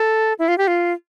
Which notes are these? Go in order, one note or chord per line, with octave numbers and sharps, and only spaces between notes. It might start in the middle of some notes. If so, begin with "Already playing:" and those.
Already playing: A4
E4
F4
G4
F4